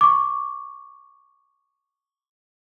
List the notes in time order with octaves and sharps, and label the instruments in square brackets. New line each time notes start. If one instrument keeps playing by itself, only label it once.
[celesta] C#6 D6